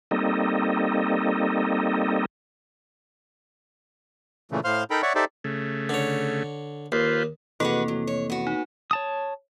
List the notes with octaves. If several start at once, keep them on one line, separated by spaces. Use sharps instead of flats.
G3 A#3 C4 D#4 A4 D#5
A#2 C#3 E3 A3
A2 C5 F5 C6 F6
D#4 A4 A#4 G5 A#5 B5
C#5 D5 E5 F#5 C#6
D#4 G4 A4 C5 D5 E5
C#3 A3
D3 C#5
D#2 F4 B4 C5
F1 C3 E3 A#3 F#4 G#4 A4 B4
F#3
C#5
B3 F#4
D#4
C#5 A5 D#6